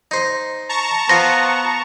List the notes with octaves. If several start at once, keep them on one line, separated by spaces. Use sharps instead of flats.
D#4 C5
A5 A#5 C#6
B3 F4 C5 A#6